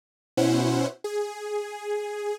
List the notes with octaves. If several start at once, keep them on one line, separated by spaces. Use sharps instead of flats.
B2 C#4 E4 C5 F#5
G#4